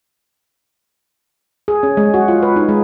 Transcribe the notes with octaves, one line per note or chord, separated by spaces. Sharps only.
G#4
C#4
G#3
F#4
F4
B4
D#4
G#3